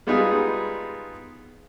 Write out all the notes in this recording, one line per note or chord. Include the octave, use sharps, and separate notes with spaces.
G3 G#3 B3 D#4 F4 G#4